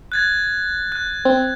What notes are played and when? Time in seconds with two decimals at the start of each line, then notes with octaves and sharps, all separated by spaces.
0.12 F#6 G#6 A6
0.92 F#6
1.25 C4